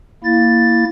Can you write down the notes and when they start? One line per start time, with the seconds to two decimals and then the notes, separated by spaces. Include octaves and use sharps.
0.24 A#3 E4 A6